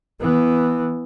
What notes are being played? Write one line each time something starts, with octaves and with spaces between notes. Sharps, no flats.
E3 B3